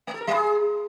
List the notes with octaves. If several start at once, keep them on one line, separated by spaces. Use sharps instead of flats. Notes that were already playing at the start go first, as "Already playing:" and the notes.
A3
A4
A#4
G3
G#4